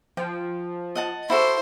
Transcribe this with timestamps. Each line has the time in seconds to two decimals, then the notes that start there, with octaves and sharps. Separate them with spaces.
0.17 F3 G5
0.95 D#5 F#5 A5
1.30 E4 F#4 A4 C5